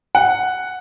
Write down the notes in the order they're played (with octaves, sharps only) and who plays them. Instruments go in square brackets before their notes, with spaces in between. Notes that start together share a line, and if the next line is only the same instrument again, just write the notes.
[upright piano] F#5